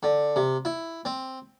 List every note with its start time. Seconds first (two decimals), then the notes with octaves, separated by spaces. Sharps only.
0.03 D3
0.36 C3
0.65 E4
1.05 C4